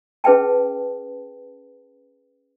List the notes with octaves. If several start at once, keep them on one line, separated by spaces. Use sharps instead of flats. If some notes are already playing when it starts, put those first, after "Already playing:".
C#4 G#4 B4 E5 G5 A5